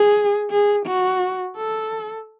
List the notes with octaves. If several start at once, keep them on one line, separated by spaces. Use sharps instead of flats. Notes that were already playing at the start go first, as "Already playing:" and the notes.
Already playing: G#4
G#4
F#4
A4